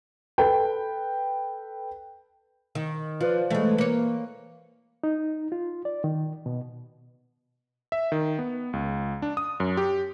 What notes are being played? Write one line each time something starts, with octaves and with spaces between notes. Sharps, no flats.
A4 B4 G5
D#3
F3 F4 B4 D5
E3 G#3 A3 B4
A#3 C#5
D#4
F4
D5
D#3
B2
E5
D#3
B3
C#2
D4
D#6
F#2
G4